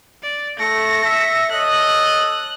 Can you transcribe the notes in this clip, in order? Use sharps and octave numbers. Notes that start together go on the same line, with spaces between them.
D5
A3 A#6 C#7
E5
A4 C#5 D#5 F#6